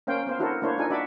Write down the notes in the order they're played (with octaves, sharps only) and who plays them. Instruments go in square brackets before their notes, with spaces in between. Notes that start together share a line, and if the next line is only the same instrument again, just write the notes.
[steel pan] A#3 C#4 C5 F5 G5
B3 C5 F5
D4 E4 F#4 A4 A#4 C5
A#3 D4 E4 C5 C#5
D4 D#4 F4 A4 G#5
D4 F#4 D5 E5 B5